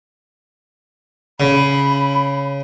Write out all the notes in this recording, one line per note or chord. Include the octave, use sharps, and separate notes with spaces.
C#3 B5